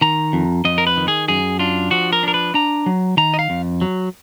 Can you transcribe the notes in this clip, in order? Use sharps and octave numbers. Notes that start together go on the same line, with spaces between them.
D#3 A#5
F2
F2 D#5
A#4
B4
D#3
G#4
F#2 G#4
D4 F4
F3 F#4
A#4
D4 A#4
B4
D4 A#5
F#3
D#3 A#5
D#5
F5
F2
F#3